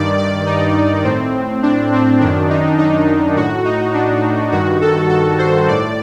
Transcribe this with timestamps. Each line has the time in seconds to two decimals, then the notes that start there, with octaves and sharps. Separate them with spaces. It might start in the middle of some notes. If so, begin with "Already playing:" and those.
Already playing: G2 D#3 D5
0.18 D5
0.46 D#4
1.04 A2 C4
1.63 D4
1.92 C4
2.20 F#2 D#3 D4
2.50 D#4
2.78 D#4
3.36 A2 F#4
3.65 D#4
3.94 D4
4.52 G2 D#3 F#4
4.81 A4
5.09 A4
5.39 C5
5.68 A2 D5